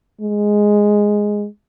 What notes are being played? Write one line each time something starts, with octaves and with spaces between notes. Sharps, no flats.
G#3